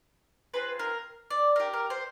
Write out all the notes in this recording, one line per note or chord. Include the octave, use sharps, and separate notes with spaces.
C4 F4 G#4 B4
A#4
D5
D4 G4 A#4
A#4
C5